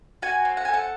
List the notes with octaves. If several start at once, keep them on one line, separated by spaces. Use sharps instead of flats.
F#4 G#5
C4
F#5
A4 G#5
F#5